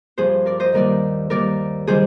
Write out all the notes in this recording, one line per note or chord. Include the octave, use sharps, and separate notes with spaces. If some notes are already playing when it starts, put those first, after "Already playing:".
G2 F3 G#4 C5
A#4 D5
C5 D#5
D#2 D#3 G3 A#4 D5
D#2 D#3 G3 A#4 D5
D#3 G3 G#4 C5